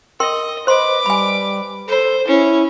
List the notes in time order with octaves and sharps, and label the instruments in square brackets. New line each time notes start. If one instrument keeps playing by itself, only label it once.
[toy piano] A#4 G5 C6 [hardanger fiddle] D#5
[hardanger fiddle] B4 D6 [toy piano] C5 C6 [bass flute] D#5
[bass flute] G3 [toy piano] G#5 B5
[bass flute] A4 [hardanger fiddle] C5
[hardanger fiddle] C#4 [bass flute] E4